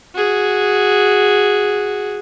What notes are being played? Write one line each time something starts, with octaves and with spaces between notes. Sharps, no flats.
F#4 G#4